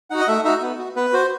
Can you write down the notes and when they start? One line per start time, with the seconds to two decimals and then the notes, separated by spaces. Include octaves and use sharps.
0.10 D#4 F#4 F#5
0.20 D#5
0.28 A3 E5
0.45 D#4 F#4 E5
0.62 B3
0.79 F#4
0.96 B3 B4
1.13 F#4 C5